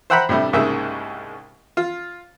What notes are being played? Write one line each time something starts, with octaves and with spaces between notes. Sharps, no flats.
C5 E5 F#5 G5 A#5 B5
A2 C3 G3 A3 D4
C2 G#2 C#3 A#3 E5
F4